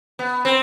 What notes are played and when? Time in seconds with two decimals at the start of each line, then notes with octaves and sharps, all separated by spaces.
0.19 B3
0.45 C4